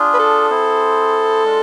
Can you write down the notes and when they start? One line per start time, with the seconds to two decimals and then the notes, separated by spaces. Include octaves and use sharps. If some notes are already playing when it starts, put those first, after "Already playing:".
Already playing: D4 F4 G#4
0.14 B4
0.19 A4
0.50 C4 E4 G#4 C5
1.44 G#3 D4 F4